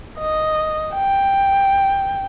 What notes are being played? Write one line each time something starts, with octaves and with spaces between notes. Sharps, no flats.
D#5
G5